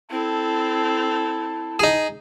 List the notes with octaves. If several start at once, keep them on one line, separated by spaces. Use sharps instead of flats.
C4 E4 A4 A5
D#4 G#4